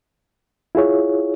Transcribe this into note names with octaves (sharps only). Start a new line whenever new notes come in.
E4 F4 G#4 C#5